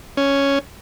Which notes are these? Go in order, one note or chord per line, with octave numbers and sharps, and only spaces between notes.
C#4